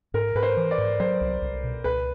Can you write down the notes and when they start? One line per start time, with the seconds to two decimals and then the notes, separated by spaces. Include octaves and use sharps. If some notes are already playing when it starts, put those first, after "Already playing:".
0.14 G#2 A#4
0.35 G#2 B4
0.43 C5
0.57 E3
0.71 D5
0.78 G#2
1.00 F#3 C5
1.21 C2
1.42 C2
1.64 B2
1.84 C#2 B4